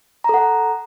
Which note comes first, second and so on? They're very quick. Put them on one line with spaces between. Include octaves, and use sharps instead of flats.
A#5 A4 F#5